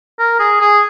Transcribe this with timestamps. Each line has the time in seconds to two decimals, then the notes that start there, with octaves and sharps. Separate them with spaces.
0.19 A#4
0.39 G#4
0.61 G#4